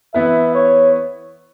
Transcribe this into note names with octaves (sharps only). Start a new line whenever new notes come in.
E3 B3 E4 B4 E5
C#5